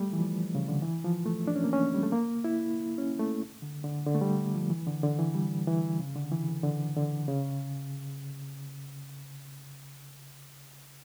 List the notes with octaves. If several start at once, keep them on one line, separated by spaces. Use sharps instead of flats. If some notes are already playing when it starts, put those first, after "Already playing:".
Already playing: G3 A3
E3
F3
C#3
D3
E3
F3
A3
D4
C#4
A#3
C#4
G3
A3
A#3
E4
C#4
A3
D3
D3
D3
A3
G3
F3
E3
D3
D3
E3
G3
E3
C#3
D3
E3
D3
D3
C#3